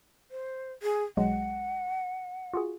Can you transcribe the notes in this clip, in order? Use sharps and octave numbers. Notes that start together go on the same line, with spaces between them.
C5
G#4
B1 F#3 G#3 F#5
F4 F#4 G#4